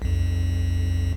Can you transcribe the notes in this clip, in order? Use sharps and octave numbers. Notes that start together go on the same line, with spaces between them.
B1 F2